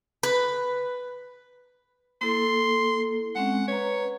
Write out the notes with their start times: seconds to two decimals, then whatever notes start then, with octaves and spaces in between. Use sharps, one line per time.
0.23 B4
2.21 A#3 E4 A4 C6
3.35 G#3 C4 C#4 F#5
3.68 B4 C#5 A#5